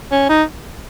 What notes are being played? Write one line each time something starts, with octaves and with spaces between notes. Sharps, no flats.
C#4
D#4